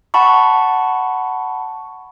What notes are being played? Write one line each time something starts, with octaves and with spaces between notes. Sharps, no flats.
F#5 A5 B5 C#6